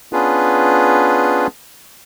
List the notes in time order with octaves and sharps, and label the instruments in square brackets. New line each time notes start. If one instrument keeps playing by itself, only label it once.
[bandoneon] B3 C#4 D4 F4 G#4 B4